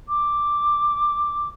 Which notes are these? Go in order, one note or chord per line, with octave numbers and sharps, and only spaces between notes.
D6